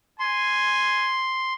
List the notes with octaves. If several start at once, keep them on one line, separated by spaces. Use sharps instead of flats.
G#5 C6